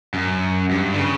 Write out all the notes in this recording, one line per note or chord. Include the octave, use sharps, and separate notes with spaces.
F#2
G2
D3
C#3